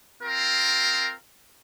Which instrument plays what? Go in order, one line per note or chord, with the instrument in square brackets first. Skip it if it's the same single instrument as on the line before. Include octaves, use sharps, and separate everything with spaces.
[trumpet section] C4 F4 A#4